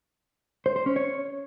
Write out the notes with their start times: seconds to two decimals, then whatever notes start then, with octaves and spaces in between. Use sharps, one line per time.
0.66 C5
0.76 C5
0.86 C#4
0.96 C#5